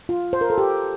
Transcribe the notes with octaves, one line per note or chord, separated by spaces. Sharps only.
F4
C5
A#4
A4
G4